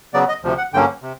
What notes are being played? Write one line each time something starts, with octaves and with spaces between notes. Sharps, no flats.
C#3 F#3 B3 D5
D#5
D2 C3 F3
F#5
G2 D3 F#3 A#3 C#4 G5
C3